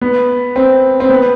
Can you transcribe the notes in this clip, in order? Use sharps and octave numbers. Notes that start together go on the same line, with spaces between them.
B3
C4
C4
B3